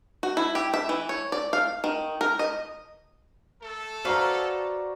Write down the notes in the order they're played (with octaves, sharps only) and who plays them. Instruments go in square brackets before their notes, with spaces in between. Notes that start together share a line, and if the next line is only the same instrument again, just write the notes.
[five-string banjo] F#4
E4
G4
E5
E3
C#5
D5
F5
D#3
A#4
D#5
[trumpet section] A3 A4
[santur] F#4 D5 E6 [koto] B4 F5 [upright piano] C5 A#5